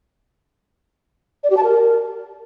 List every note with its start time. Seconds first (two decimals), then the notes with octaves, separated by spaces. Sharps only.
1.44 D5
1.50 G4
1.57 A5
1.64 A#4